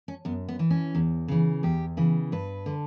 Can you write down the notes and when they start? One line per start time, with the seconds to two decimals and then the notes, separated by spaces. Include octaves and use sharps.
0.08 C#4
0.25 F#2 B3
0.49 B3
0.59 E3
0.70 C#4
0.95 E2
1.28 C#3 E3
1.63 E2 G4
1.97 C#3 E3
2.32 G2 B4
2.66 D3